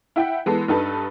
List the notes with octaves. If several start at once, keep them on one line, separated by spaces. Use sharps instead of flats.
E4 E5 F#5 G5
E3 G#3 B3 A4
G2 D#4 A4 B4